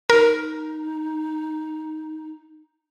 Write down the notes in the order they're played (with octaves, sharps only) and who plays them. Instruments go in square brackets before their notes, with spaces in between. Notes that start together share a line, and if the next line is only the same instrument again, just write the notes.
[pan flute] D#4 [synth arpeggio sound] A#4